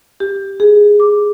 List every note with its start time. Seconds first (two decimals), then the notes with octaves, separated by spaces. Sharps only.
0.20 G4
0.60 G#4
1.00 D6